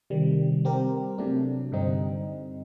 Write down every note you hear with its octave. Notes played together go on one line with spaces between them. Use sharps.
C3 D#3 G3
G3 C4 G4 A#4
C3 F#3 A3 D4
G2 D3 G3 C4 D#4